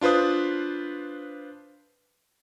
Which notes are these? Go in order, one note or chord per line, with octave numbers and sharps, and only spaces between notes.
D4 F4 B4 C5 D#6